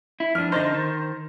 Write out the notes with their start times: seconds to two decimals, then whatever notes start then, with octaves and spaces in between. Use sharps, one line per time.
0.20 E4
0.35 F2 D4 F6
0.52 D3 D#4 C5 A6 A#6
0.74 D#3